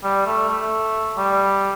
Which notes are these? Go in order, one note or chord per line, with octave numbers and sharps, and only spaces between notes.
G3
A3
A3
G3